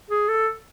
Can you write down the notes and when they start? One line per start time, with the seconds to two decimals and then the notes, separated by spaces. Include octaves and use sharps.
0.10 G#4
0.29 A4